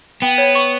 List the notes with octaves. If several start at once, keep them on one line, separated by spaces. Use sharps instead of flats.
B3 G5
C#5
C#6